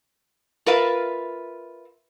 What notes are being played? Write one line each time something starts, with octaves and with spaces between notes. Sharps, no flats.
F4 A#4 B4 E5 F5